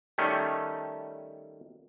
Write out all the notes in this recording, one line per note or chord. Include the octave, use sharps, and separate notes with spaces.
D#3 G3 A3 C#4